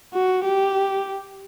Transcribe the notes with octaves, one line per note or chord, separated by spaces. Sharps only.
F#4
G4